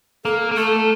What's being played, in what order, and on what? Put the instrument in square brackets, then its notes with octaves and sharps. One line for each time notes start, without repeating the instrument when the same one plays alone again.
[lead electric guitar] A#3 [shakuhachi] A4
[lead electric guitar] A#3
[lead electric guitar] A3 [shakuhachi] A4